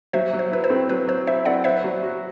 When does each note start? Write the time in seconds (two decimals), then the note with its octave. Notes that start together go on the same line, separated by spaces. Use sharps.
0.13 F#3 C5 E5
0.33 F#3
0.39 C5
0.52 E4 B4
0.64 C5
0.70 C4
0.89 F#3 B4
1.07 F#3 C5
1.27 E4 C5 E5
1.45 C4 D5 F#5
1.64 B4 C5 E5
1.84 F#3
2.03 F#4